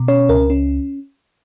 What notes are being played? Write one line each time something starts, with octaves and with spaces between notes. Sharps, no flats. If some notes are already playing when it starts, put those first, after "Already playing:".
Already playing: B2
C#4 C#5
C#2 A#4
C#4